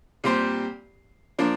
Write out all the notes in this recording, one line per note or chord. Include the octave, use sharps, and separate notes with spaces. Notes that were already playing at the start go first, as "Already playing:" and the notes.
A#2 G3 C4 G4 C5
F3 A#3 D4